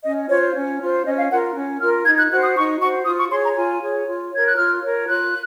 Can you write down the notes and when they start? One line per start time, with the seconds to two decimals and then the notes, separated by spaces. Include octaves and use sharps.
0.04 C#4 D#5
0.29 F4 C5 C#5
0.55 C#4
0.81 F4 C5
1.06 C#4 D#5
1.18 F5
1.30 F4 A#4 F#5
1.55 C#4
1.80 F4 A#4 F6
2.05 D#4 G#6
2.18 F#6
2.30 F#4 C5 F#6
2.43 D#6
2.56 D#4 C#6
2.81 F#4 C5 C#6
3.06 F4 D#6
3.20 C#6
3.31 G#4 C#5 C6
3.45 A#5
3.56 F4 G#5
3.82 G#4 C#5
4.07 F4
4.31 A#4 C#5 G#6
4.47 F#6
4.57 F4 F6
4.83 A#4 C#5
5.07 F4 F#6